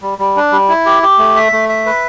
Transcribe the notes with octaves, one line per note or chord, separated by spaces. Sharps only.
G3
G3
D4
G3
E4
G4
G4
A3
E5
A3
E5
B4